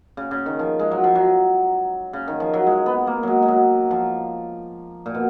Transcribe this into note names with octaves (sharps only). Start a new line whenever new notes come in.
C#3
C#3
D#3
F3
G#3
F#3
F3
F#3
C#3
D#3
F3
F#3
G#3
B3
A#3
F#3 G#3
G#3
F#3
F3
A#2
B2